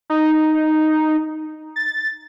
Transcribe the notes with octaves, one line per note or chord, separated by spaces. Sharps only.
D#4
A6